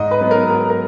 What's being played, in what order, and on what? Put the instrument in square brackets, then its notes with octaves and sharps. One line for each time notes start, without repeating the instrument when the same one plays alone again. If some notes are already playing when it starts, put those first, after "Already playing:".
Already playing: [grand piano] G#2 D#5
B4
F#3 B3 D#4
A#4
G#2 A#4
A#4